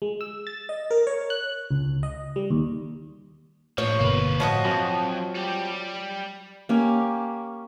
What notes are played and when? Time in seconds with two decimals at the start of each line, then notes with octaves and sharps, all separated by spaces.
0.02 G#3
0.21 E6
0.47 A6
0.69 D#5
0.91 A#4
1.07 C#5
1.30 F#6
1.71 C#2
2.03 D#5
2.36 G3
2.51 D#2
3.78 A2 F3 A#3 C#5
4.00 G1 B2 A#3 B4
4.40 A2 F3 F#4 C#5 D#5
4.65 F2 F#3
5.35 G3 G4
6.69 A#3 C#4 G4